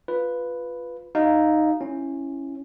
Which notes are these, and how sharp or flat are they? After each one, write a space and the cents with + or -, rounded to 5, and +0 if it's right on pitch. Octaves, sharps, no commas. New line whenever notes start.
F4 +0 B4 +0
D#4 -5 F#4 +25 F5 +0
C#4 -10 E4 +0